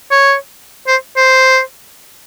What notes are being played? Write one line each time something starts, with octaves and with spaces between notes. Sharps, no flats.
C#5
C5
C5